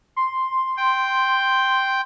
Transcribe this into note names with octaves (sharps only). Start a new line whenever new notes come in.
C6
G5